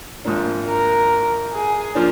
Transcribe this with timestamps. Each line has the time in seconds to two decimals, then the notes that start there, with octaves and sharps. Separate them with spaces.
0.25 G#1 G#2 F3 A#3 D4
0.68 A#4
1.53 G#4
1.95 F3 A#3 D4